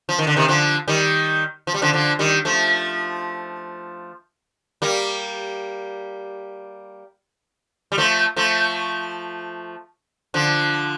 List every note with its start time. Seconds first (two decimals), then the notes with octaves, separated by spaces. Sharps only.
0.09 F3
0.19 D#3
0.27 D3
0.36 C3 D#3
0.48 D3 F3
0.88 D#3 G3
1.67 F3
1.74 G3
1.82 D3 F3
1.93 D3 F3
2.19 D#3 G3
2.45 F3 A3
4.82 G3 A#3
7.92 G3
7.98 F3 A3
8.37 F3 A3
10.34 D3 F3